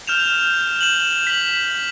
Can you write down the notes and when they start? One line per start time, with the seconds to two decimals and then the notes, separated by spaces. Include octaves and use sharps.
0.07 F6 G6 E7 F7
0.81 E7 F#7
1.27 B6 F#7